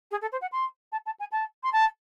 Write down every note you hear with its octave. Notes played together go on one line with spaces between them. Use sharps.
G#4
A4
C5
F#5
C6
A5
A5
G#5
A5
C6
A5